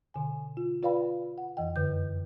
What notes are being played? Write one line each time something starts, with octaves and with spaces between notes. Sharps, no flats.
B2 D3 G#5
F4
F4 B4 D5 F5 G5 B5
F#5
F2 E3 D#5 G5
F#2 D3 B4 G6